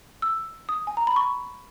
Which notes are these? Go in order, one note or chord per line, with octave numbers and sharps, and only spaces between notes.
E6
D#6
G#5
A#5
B5
C#6